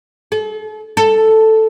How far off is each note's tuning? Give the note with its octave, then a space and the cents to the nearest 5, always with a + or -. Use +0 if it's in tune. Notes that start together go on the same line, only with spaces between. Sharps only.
A4 -40
A4 +0